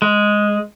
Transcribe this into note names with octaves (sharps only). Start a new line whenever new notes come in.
G#3